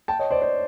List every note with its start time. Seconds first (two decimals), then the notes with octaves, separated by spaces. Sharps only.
0.08 G5 A5
0.19 C#5 D#5
0.31 C5 D5
0.42 C5 D5